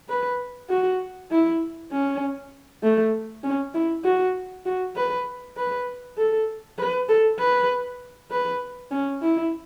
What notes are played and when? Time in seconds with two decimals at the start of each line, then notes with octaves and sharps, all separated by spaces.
0.09 B4
0.70 F#4
1.31 E4
1.92 C#4
2.83 A3
3.44 C#4
3.74 E4
4.04 F#4
4.66 F#4
4.96 B4
5.57 B4
6.17 A4
6.78 B4
7.09 A4
7.39 B4
8.31 B4
8.91 C#4
9.22 E4